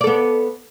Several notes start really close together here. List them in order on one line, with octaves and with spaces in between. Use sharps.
D5 A4 B3